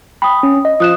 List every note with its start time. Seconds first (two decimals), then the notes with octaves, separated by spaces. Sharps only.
0.22 G5 B5 D#6
0.43 C#4
0.65 D#5
0.80 F3 D#6 F#6 E7